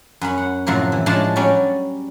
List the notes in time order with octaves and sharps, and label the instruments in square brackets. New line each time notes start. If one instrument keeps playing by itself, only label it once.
[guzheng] F#2 C#4 B5
F#5
F#2 A2 C3 F3 F#3
E3
A2 F3 G#3 C#4 D4 A5
F#3 G3 C#4 D5